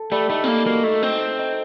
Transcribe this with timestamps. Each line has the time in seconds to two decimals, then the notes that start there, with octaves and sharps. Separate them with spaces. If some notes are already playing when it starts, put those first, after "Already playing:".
Already playing: A4
0.12 G3 A3
0.30 A3 D#4
0.44 C4
0.48 A#3 D#4
0.66 A#3 F#4
0.84 A3 D#4
1.03 C4 D#4
1.21 A3
1.39 D#4